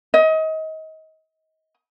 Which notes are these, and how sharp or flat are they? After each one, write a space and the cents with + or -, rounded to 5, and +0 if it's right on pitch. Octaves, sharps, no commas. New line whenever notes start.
D#5 +30